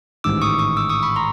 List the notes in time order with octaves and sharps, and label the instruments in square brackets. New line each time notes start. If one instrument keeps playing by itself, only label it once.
[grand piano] A1 G#2 D#3 [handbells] D6 E6
[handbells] C#6 D#6
C#6 D#6
D6 E6
C#6 D#6
B5 C#6
A#5 C6